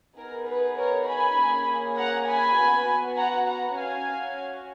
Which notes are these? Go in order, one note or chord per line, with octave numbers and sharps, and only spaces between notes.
B3 D#4 G#4 A#4
B4
A#4 C#5
G#5 B5
A#3 C#4 G#4
F#5 A#5
G#5 B5
B3 F#4
F#5 A#5
F#5 A#5
C#4 F#4 F5 G#5